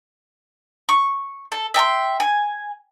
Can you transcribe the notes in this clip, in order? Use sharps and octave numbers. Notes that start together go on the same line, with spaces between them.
C#6
A4
E5 G5 A#5 C6
G#5